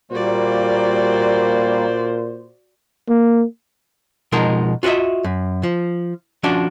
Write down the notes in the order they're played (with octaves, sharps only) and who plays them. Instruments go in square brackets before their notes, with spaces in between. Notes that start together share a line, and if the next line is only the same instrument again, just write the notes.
[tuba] A#2 [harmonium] G3 A#3 [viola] F#4 D5 [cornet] C5
[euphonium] A#3
[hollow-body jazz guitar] B2 F3 G#3 D#4 A#4
F4 F#4 B4 D#5 E5
F#2
F3
F3 C#4 D4 F#4 D5